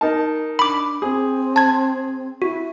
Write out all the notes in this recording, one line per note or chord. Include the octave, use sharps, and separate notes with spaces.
D#4 A#4 A5
D4 B5 D6
C4 G#4
A5 G#6
E4 F#4